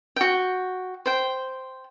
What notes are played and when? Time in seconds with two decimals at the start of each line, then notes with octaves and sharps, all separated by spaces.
0.16 F#4 G5
1.06 C5 G5